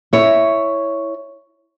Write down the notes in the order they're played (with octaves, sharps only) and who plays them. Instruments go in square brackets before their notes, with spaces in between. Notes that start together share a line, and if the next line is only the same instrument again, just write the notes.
[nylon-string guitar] E4 C#5